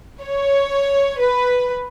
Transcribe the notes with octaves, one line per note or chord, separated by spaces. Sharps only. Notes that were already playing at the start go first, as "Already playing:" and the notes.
C#5
B4